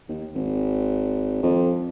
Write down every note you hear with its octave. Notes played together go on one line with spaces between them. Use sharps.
D#2
G#1
F2